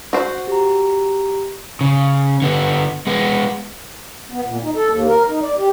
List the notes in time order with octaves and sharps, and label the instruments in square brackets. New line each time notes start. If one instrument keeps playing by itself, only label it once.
[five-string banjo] F#4 C5
[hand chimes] G4 A#5
[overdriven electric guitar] C#3
D3 B3
G#3 B3
[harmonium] B3
A#2
D#4
A4
D#2
A#4
D#4
D5
G4